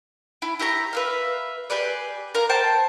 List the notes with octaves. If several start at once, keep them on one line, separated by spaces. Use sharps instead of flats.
E4
E4 G4 C#5 A#5
B4 E5 F5
G4 G#4 B4 D5
A#4 F5 A#5
C5 G5 A5